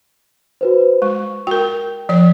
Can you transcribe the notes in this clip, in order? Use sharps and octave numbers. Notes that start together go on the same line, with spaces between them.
F#4 B4 C5
G#3 C#6
F#4 A#4 G5
F3 C#5 D5